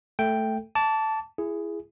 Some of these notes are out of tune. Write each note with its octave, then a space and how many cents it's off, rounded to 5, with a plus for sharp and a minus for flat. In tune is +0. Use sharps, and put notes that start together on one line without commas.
A3 +0 A4 +0 G5 +0
A5 +0 D6 -35
E4 +25 G#4 +0